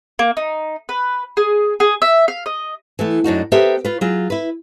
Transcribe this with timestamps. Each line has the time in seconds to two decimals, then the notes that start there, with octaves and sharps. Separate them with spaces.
0.19 A#3
0.37 D#4
0.89 B4
1.37 G#4
1.80 G#4
2.02 E5
2.28 F5
2.46 D#5
2.99 E3 A3 B3
3.24 F#2 D4 D#4 F#4
3.52 B3 G4 A4 A#4 C5 E5
3.85 F4 B4
4.01 F#3 F4 G#4
4.30 E4 B4